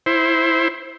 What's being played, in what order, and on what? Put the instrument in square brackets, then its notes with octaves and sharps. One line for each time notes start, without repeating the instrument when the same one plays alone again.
[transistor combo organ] E4 C5